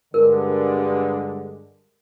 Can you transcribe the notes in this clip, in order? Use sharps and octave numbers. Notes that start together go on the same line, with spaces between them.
G2 D3 G#3 A#4